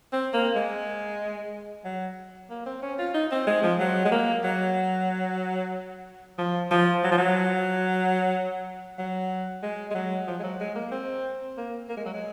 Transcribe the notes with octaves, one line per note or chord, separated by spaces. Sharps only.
C4
A#3
G#3
F#3
A#3
C4
C#4
F4
D#4
C4
G#3
F3
F#3
G#3
A#3
F#3
F3
F3
F#3
F3
F#3
F#3
G#3
G#3
F#3
F3
G#3
F#3
G#3
A#3
C4
A#3
A#3
G#3
F#3
G#3